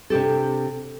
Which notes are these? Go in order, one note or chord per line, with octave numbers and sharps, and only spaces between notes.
C3 D4 G4 A4